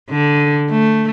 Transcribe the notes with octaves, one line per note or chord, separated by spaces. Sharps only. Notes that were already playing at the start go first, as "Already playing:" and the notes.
D3
A3